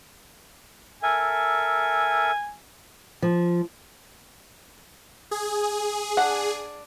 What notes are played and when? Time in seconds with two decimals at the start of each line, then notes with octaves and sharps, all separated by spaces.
1.03 A4 A#4 E5 G#5
3.22 F3
5.31 G#4
6.17 D4 F#5